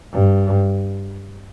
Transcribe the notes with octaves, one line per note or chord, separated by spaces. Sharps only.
G2